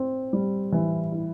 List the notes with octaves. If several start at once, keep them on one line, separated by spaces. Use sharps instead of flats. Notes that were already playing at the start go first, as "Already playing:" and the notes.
Already playing: C4
G3
E3
E4